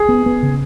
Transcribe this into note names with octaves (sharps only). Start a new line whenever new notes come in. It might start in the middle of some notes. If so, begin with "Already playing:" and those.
Already playing: G#4
B3
B3
C#3